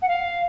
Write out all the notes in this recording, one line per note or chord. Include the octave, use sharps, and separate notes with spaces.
F#5
F5